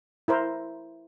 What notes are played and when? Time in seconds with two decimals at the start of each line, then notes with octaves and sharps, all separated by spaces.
0.28 E4 A#4 C5